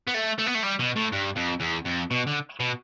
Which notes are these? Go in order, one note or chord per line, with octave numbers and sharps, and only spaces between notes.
B3
A3
A3
B3
A3
G3
B2
A2
G2
F2
E2
F2
B2
D3
B2